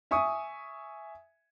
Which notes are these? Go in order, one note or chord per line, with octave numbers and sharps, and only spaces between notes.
E5 G#5 C#6 D#6